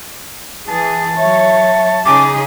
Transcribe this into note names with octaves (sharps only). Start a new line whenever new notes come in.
E3 G#4 A5
F#3 C#5 E5
C#3 D#4 G#4 D6